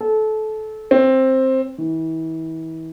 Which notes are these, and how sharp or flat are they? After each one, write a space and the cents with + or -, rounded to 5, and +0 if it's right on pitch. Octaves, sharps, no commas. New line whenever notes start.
A4 -25
C4 +10
E3 -35